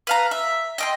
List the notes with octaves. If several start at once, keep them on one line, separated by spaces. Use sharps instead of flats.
B4 F5 A#5
E5
D#5 G5 C6